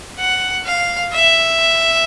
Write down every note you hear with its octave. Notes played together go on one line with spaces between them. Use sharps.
F#5
F5
E5